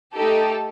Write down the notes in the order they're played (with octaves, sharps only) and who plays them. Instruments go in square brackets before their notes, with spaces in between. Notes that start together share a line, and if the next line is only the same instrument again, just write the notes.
[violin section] A3 D#4 G4 A4